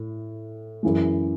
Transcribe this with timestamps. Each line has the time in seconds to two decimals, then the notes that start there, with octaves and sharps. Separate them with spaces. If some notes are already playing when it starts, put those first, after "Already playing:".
Already playing: A2
0.83 F#2 E3 G#3